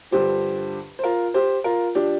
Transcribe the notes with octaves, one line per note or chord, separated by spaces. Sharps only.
G2 D3 F3 G4 C5
C5
F4 A#4
G4 C5
F4 A#4
F3 D4 G4